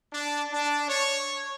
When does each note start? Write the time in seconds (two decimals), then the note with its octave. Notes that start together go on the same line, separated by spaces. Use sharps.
0.13 D4
0.52 D4
0.87 C#5